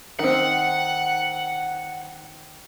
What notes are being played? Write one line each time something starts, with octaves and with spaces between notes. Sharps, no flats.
D#3 C4 F#5